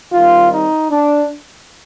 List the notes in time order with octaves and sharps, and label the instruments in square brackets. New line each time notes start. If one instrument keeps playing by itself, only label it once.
[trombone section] D#3 G3 C4 F4
D#4
D4